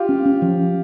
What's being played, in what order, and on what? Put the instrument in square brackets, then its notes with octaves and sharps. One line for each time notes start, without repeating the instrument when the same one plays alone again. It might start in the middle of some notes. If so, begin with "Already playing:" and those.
Already playing: [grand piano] F4 G4
[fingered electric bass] C#4
C#4
F3